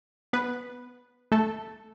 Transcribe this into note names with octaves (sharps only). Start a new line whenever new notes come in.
B3 B4
A3 A4